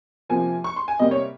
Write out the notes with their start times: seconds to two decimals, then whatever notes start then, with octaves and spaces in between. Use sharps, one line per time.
0.29 C3 F3 A#3 G#5
0.64 C#6
0.76 C6
0.88 G#5
0.99 C3 G3 A#3 D#5
1.11 C#5